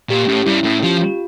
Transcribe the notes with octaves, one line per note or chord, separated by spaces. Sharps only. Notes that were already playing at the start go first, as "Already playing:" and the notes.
A#2 G4
A2 C#4
G2 E4
A2 C#4
F3 G4
F4